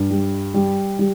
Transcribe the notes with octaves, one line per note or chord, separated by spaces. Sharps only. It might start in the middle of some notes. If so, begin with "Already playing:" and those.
Already playing: G2
G3
G3
G3